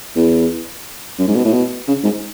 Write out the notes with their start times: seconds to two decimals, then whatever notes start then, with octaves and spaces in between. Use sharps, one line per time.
0.15 E2
1.18 F#2
1.28 G#2
1.35 B2
1.45 A2
1.53 B2
1.88 C#3
2.04 G#2